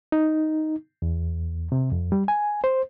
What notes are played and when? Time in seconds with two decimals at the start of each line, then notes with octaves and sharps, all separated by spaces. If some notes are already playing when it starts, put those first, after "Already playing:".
0.12 D#4
1.02 E2
1.72 C3
1.92 F2
2.12 G3
2.28 G#5
2.64 C5